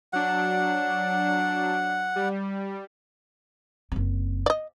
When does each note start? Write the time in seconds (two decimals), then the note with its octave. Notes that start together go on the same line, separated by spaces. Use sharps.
0.13 F#3 D4 F#5
2.16 G3
3.92 F#1 C4
4.46 D5 D#5